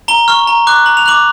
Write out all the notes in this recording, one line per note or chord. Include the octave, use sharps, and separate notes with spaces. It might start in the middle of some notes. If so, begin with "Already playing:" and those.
A#5 G7
C#6 F6
A#5
D6 F#6
A#5 F#7
F7
D6 F#6 F#7